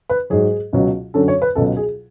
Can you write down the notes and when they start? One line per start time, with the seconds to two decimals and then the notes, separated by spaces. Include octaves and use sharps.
0.10 B4
0.30 G#2 F#3 G#4
0.73 C#2 B2 F#3
1.14 F#2 D3 F#3 A4
1.28 C#5
1.42 B4
1.55 C#2 B2 F#3 A4
1.77 G#4